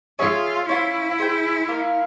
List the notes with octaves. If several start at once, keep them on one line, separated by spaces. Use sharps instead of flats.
F4 G#4 C#5 E5 G#5
C#4 E4 F4 C5
G#4 C5 G5
A#3 F4 A#4 F5